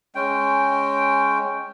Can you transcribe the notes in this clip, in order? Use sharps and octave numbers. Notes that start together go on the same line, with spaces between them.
G#3 C#4 G5